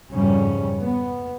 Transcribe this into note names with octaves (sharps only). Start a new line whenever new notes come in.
F2 G#2 C#3 G3 C#4
B3